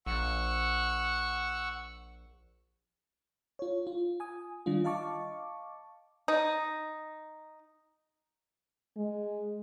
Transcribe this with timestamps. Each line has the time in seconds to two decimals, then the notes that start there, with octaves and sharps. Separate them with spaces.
0.06 A#1 F#5 C#6 E6
3.59 F4 C#5
3.87 F4
4.20 G#5 D#6
4.66 D#3 G3 D4 F4
4.84 D#5 F5 A5 C#6 D6
6.28 D#4
8.97 G#3